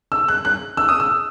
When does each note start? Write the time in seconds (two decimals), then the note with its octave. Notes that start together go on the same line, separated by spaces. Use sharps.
0.12 E6
0.28 F#6
0.45 F#6
0.77 E6
0.89 D#6
1.00 E6